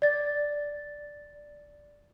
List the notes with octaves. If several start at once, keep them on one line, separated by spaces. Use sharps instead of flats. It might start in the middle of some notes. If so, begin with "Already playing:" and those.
D5 A6